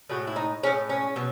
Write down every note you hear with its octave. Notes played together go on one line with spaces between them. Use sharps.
A2 G#3 F#4
E4
D#4
A2 G#3 C#4
C#4
B2 F#3